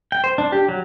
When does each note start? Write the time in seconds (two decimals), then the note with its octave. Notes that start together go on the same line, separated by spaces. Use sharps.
0.12 G5
0.24 C5
0.38 D4
0.52 G4
0.69 F#3